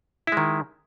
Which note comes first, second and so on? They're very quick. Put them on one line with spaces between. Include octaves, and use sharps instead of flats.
E4 G#3 D#3